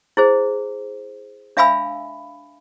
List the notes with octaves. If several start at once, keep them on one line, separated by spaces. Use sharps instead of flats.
E4 G#4 C5
D4 E5 F5 G#5 B5 E6